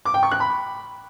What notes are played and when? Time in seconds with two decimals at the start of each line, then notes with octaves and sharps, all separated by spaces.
0.05 D6
0.14 G5
0.23 C#6
0.31 F#6
0.40 B5